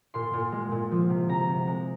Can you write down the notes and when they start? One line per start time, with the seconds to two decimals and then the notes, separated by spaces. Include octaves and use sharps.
0.14 A#2 C6
0.34 A#2
0.52 G#3
0.71 A#2
0.91 F3
1.10 C3
1.29 C3 A#5
1.48 C3
1.67 G#3